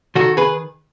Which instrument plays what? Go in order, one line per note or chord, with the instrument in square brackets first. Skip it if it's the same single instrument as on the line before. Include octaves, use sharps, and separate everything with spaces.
[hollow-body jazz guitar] D#3 F#4 A4
G#4 B4